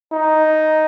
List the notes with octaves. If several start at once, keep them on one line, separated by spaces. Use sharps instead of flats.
D#4